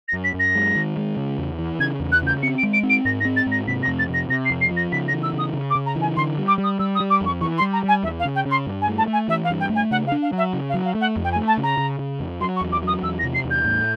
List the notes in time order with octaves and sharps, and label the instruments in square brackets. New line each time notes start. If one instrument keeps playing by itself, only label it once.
[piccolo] A#6
[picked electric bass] F#2
[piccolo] B6
[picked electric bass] F#2
[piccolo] A#6
[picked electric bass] G#3
D#3
G#3
C#3
E2
E3
[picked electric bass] C#3 [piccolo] G#6
[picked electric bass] E2
[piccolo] F#6
[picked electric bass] C#3 [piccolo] G6
[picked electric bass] C4 [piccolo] C#7
[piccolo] D7
[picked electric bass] G#3
[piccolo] D7
[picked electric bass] C4
[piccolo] D7
[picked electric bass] G#2 [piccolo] A#6
[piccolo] A#6
[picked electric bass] C4
[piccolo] A6
[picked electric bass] G#2
[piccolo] A#6
[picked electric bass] C3 [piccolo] B6
[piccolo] A#6
[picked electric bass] F2
[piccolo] A6
[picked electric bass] C3 [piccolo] A#6
[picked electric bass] C3 [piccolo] A#6
[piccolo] C7
[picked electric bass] F2
[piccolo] C7
[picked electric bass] F3
[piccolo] A#6
[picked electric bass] C#3 [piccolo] B6
[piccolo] A#6
[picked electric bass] E3
[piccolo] E6
[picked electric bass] C#3 [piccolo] D#6
[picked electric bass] C#3
[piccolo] D6
[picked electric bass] C#3
[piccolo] A#5
[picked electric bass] E3
[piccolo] G#5
[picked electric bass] D3 [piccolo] C6
[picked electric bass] G3
[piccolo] D6
[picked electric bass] G3
[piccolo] D#6
[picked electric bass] G3 [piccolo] E6
[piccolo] D#6
[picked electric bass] G3
[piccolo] D6
[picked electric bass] F2 [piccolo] C#6
[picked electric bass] E3 [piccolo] C#6
[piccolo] C6
[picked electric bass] G3
[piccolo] A#5
[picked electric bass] G3 [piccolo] G#5
[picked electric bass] E2 [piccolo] E5
[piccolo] F5
[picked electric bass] C#3
[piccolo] G5
[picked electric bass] C#3 [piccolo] C6
[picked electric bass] G2
[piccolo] G#5
[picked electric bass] A3
[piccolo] A5
[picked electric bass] A3 [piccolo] G#5
[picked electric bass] E3 [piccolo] E5
[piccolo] F5
[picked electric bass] G2
[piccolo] G5
[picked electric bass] A3
[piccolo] G#5
[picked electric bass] C#3 [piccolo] F#5
[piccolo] F5
[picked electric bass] D4
[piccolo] F5
[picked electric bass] F#3
[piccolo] E5
[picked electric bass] C#3
[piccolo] F5
[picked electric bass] F#3
[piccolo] F5
[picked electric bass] A3
[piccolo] F#5
[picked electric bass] F2
[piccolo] G5
G#5
[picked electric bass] A3
[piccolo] A5
[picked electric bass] C#3
[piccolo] A#5
[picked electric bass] C#3
C#3
F2
[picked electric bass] F#3 [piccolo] C6
[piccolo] C#6
[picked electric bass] E2
[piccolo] D6
[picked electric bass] F#3 [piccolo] D#6
[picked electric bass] E2 [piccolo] E6
[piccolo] A#6
[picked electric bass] C3
[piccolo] C7
[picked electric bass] E2
[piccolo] G6
[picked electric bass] A2